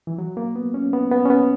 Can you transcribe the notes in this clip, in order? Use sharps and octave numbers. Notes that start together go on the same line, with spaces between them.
E3
F#3
A#3
B3
C#4
B3
B3
C#4
B3